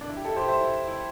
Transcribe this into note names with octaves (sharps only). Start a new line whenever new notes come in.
D4
E4
G4
E4 A4
G4 C5
C5 E5
E4
E4